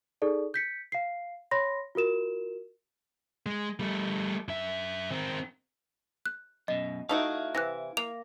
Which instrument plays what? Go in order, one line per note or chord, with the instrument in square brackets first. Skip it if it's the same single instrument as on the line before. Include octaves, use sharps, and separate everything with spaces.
[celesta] D#4 G#4 A4 D5
G6 B6 C#7
F5 C7
C#5 B5 C6 A#6
F4 F#4 A#4 E7
[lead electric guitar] G#3
G3 A3
F#2 E5
D#3 C4
[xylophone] F#6
[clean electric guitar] F#2 B2 [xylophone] D#5
[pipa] A3 D#4 F#4 [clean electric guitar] E4 F5
[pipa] C3 E3 [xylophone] F#6 A#6
[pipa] A#3 [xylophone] F7